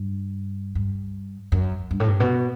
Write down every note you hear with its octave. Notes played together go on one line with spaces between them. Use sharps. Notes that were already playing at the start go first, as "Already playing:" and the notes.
Already playing: G2
G2
F#2
G2
A2
G2
B2